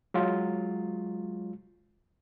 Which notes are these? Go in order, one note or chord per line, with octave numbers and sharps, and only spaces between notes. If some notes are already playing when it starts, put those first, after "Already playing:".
F#3 G#3 F4